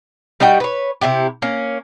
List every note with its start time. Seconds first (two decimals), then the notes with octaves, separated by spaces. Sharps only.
0.40 G3 D#4 F#4 G5
0.60 B4 C#5
1.01 C3 E3 E4 G4
1.42 A#3 C#4